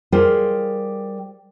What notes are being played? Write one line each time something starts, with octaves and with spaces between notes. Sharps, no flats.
G3 F4 G#4 A#4 C5